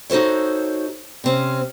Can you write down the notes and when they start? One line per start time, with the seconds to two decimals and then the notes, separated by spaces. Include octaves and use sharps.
0.10 D#4 F#4 A4 C5 C#5
1.24 C3 C4 C#4